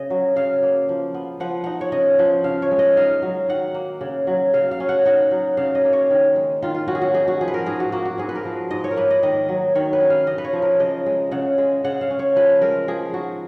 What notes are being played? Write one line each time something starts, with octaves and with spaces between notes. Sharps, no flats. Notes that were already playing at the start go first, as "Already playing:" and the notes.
Already playing: C#3 D#5
F#3
C#3 F5
A#3
F3
B3
F3 F#5
D#4 F#5
C#5
C#3 D#5
F3
C#3 F5
C#5
G#3
D#5
D#4 F5
F#3
D#3 F#5
A#3
C#3
F#3
C#3 F5
F5
C#4
F#5
D#4 F#5
F#3
C#3 F5
D#5
A#3
C#5
D#3
G#3
D#3 F4
F4
C#4 F#4
G#4
F#4
D#4 G#4
F#4
F3 G#4
B4
A#4
G#2 G#4
F#4
A#3 F#4
F#4
G#2 G#4
B4
A#4
F3
G#2 D#5
C#5
A#4
A#3 B4
D#5
D#3 D#5
F#3
D#3 C#5
B4
C#4
F5
C#3 D#5
B4
C#5
F3
A#4
C#3 D#5
G#3
C#3 F#5
G#3
C#3 F#5
F5
C#4
C#5
F3 B4
G#3 A#4
F3 G#4
D#4 F#4